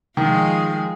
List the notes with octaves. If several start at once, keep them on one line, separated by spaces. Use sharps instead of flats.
D#3 F3 G#3 G#4